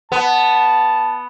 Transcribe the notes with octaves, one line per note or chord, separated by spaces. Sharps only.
B3 A5